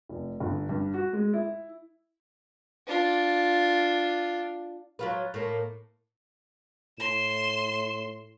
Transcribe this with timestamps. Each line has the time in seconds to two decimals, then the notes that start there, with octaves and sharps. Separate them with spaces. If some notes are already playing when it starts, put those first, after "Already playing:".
0.09 F1
0.40 G1
0.69 G2
0.94 F#4
1.13 G#3
1.34 E4
2.87 D4 F4
4.99 F#3 F4 B4
5.34 A2 A#3
6.99 A2 C6 E7